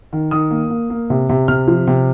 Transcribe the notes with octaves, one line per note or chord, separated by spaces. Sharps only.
D#3
D#3 D#6
A#3
A#3
A#3
C3
C3
C3 F6
F3
C3